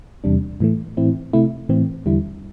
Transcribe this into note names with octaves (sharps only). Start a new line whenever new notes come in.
E2 C3 G3 D4
A2 E3 A3
A2 E3 C4 E4
C3 A3 E4
A2 E3 C4
E2 D3 G3 E4